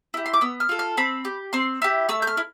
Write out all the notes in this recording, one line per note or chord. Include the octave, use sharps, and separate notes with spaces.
E4 G4
C6
D6
B3 E6
F6
F4 A4
F6
C4 B5
G4
C4 C6
E4 G4
A3 E6
G6
F6
E4